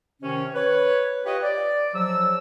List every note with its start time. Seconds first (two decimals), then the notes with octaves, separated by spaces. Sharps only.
0.22 C3 D#3 C#4
0.55 B4 C#5
1.26 F4 G4 B4 C#5 D#5 G5
1.43 D5
1.95 G#2 F3 F#3 E6